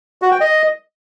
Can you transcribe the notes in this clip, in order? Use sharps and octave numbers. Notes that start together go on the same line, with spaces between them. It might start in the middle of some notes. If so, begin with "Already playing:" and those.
F#4
G5
D#5